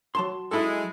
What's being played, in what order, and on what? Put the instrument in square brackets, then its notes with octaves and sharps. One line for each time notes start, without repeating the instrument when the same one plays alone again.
[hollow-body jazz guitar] F#3 A5 C6
[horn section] G#3 [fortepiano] E4 A4